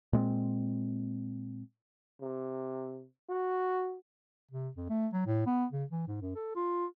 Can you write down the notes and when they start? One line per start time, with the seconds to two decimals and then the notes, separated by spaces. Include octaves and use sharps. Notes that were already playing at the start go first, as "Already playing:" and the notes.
0.13 A#2 G#3 C4
2.21 C3
3.29 F#4
4.51 C3
4.77 F2
4.89 A3
5.13 F#3
5.27 A2
5.46 B3
5.73 C#3
5.91 E3
6.08 G#2
6.21 F#2
6.35 A4
6.56 F4